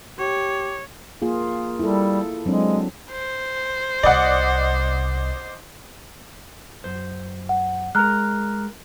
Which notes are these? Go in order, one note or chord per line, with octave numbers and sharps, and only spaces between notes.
G4 C#5
A#3 F4 G#4
G3 E4 A4
F#3 G#3 C4 D4
C5
C2 C3 D5 D#5 F#5
F#2 C5
F#5
G#3 A#4 A#5 F6 F#6